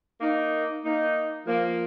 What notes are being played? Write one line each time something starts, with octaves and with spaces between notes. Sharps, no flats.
A#3 D#4
A#3 D#4
F3 A#3